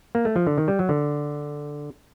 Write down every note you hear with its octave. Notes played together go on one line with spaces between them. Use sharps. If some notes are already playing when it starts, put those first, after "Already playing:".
A#3
A3
F3
D3
D#3
G3
F#3
D3